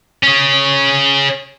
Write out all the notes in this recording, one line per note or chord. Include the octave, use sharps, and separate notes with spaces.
C#4 G#4